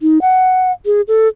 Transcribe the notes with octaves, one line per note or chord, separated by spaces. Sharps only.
D#4
F#5
G#4
A4